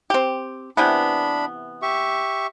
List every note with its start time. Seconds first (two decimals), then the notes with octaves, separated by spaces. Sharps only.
0.10 C4 G4
0.77 C3 E3 B3 D4 B5
1.82 G4 E5 C#6